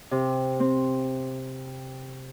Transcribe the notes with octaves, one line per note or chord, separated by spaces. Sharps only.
C3
C4